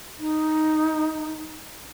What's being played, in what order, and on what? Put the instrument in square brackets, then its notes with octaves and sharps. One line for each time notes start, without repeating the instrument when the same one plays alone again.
[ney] D#4